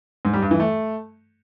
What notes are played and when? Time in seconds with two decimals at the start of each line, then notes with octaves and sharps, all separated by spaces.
0.25 G#2
0.33 G3
0.42 G2
0.51 E3
0.60 A3